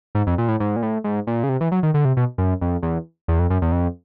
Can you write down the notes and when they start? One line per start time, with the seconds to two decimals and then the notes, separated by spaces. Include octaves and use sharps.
0.15 G#2
0.27 F2
0.38 A#2
0.48 A2
0.60 G#2
0.76 A#2
0.83 A2
1.04 G#2
1.27 A#2
1.44 C#3
1.49 C3
1.61 E3
1.72 F#3
1.83 D#3
1.94 D3
2.05 C3
2.17 B2
2.38 F#2
2.61 F2
2.83 E2
3.28 E2
3.39 F2
3.50 F#2
3.62 E2
3.72 F2